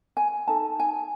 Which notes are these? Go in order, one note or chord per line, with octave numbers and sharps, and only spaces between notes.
G#5
D#4 A4 A5
G#5